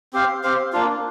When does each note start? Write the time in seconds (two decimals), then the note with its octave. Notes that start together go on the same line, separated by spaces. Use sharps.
0.13 C4 G4 C5 F5
0.43 C4 G4 C5 F5
0.73 A#3 D4 F4